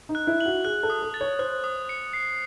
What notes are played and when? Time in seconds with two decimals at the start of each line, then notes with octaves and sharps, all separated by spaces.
0.09 D#4
0.15 F#6
0.27 E4
0.41 F#7
0.46 F#4
0.65 G#4 F#6
0.83 A4
0.90 D#6
1.02 A4
1.14 A6
1.21 C#5
1.39 C5 F#6
1.64 D#6
1.89 C#7
2.13 C7